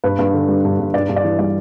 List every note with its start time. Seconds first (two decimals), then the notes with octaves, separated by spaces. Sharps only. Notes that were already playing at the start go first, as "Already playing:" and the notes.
0.04 G2 B4
0.19 G2
0.33 D3
0.48 G3
0.65 G2
0.80 G2
0.94 G2 D5
1.09 G2
1.16 D5
1.24 E3
1.39 G3 D5